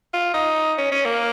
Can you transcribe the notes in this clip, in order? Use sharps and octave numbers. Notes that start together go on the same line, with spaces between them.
F4
D#4
C#4
C#4
A#3